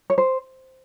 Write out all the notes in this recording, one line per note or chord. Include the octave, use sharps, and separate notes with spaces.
C#5
C5